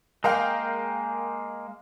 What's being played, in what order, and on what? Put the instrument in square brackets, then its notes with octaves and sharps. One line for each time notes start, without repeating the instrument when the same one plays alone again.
[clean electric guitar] G#3 A#3 [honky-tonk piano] A#4 F5 G5